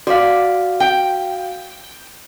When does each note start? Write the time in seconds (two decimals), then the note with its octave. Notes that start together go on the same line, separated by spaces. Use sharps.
0.07 F#4 D5 F5
0.80 G5